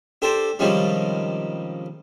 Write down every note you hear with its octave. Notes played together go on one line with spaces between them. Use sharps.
D4 G4 A4 C5
C3 D#3 F3 G3 G#3 C#4